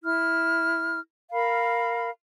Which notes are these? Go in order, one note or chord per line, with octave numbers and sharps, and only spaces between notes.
E4 F6
A#4 F5 B5